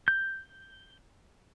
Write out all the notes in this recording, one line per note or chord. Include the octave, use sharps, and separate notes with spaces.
G6